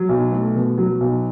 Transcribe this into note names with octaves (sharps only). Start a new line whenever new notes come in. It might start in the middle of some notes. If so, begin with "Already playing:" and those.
Already playing: F#3
B1
A3
B2
F#3
B1